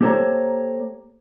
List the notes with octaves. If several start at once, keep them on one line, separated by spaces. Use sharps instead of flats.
A#3 G4 A4 C5 C#5 A#5